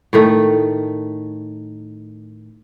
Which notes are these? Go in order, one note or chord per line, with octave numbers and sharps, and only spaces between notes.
A2 D#3 A3